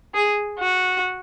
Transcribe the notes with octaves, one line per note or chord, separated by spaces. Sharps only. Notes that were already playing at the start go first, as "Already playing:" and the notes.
G#4
F#4